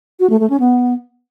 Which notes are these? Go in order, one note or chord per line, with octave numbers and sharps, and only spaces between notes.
F#4
A3
A3
C#4
B3